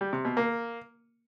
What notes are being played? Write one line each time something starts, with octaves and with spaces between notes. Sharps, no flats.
G3
C3
B2
A#3